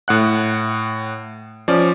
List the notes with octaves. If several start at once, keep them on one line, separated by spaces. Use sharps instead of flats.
A2 F#5 F#6
F3 C#4 D5